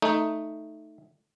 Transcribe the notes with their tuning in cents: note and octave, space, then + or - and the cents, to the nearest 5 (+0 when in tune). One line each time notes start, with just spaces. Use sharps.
A3 +0 D#4 +0